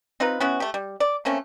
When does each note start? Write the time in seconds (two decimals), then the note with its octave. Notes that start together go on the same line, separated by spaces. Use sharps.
0.20 C4 D#4 F4 B4
0.40 B3 C#4 E4 F#4
0.60 A3 G4
0.74 G3
1.00 D5
1.25 A3 A#3 C4 C#4